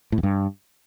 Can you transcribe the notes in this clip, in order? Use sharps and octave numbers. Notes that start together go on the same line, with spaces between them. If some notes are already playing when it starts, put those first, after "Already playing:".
A2
E2
G2